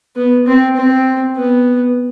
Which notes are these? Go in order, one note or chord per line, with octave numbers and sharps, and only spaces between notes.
B3
C4
C4
B3